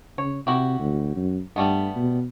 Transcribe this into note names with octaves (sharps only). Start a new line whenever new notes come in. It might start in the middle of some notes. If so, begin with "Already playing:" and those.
C#3 C#5
C3 E4 F#4 G4
D2
F#2
G2 G3 A3 B3
B2